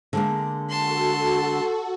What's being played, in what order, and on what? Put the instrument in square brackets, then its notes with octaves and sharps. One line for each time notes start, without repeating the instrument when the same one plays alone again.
[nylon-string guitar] D3 G#3 A#3
[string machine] F#4 A4 [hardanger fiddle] A5 C6